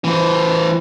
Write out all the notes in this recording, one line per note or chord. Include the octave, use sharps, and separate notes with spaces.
E3 C5